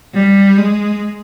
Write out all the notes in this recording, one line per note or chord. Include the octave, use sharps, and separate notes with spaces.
G3
G#3